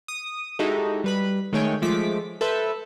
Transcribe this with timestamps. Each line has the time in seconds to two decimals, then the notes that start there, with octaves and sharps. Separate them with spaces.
0.08 D#6
0.59 G#3 D#4 E4 F#4 G4 A4
1.04 G3 B4 B5
1.52 D#3 G#3 A3 C#5 G5 G#5
1.82 F3 G#3 A3 D6 B6
2.41 A4 B4 C5 E5